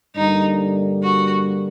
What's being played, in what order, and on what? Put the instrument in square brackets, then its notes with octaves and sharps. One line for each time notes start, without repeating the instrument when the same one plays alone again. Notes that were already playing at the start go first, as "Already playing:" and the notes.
[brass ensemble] G2 D3 G3 A#3 [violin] D#4
[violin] F#4